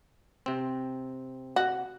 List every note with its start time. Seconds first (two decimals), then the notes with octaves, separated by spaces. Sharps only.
0.46 C3 C4
1.56 F#4